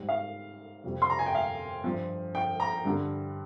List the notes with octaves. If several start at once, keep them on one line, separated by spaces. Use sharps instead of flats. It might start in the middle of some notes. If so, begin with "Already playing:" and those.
Already playing: G#2 G3
F5
F2 C3 G3
C6
A#5
G#5
G5
F5
G2 F3
G5
A#5
G2 D3 G3